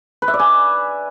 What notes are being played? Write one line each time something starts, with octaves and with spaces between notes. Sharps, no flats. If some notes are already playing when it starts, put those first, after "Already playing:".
B4
E5
D5
G#5